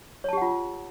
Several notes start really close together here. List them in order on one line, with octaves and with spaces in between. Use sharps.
C#5 A5 G4 F#5 F4